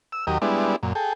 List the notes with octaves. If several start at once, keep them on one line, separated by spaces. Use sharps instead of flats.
E6
D#2 F#3 G4 A#4 D#5
G3 G#3 B3 D4 E4
F#2 A#2
G#4 A4 G5